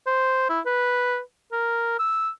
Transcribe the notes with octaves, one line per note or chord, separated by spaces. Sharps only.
C5
E4
B4
A#4
E6